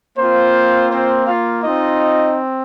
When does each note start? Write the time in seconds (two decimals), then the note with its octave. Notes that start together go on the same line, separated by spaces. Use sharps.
0.18 A#3 C4 F4 C5
0.91 C4 C5
1.27 F4 F5
1.64 C4 D#4 F4 D#5